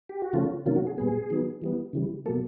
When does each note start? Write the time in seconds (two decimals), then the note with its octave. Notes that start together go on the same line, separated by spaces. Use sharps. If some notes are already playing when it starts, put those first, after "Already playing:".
0.09 G4
0.22 F#4
0.33 C#3 F3 A3 C#4 F4
0.66 C3 D#3 F#3 A#3 C#4 F4
0.76 F#4
0.87 G#4
0.97 A#2 G3 B3 G#4
1.30 D#3 F#3 B3
1.62 E3 G3 B3
1.93 C#3 E3 G3
2.26 B2 F#3 A#3 A4